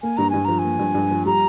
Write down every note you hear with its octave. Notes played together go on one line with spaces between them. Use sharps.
A#3 G#5
G2 A#5
G2 G#5
F3 A#5
G#5
A#3
G2
G2
F3
G3 A#5